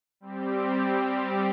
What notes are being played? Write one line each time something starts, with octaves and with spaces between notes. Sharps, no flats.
G3 C4 G4